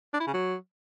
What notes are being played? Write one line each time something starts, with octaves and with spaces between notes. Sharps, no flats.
D4
E4
C#3
F#3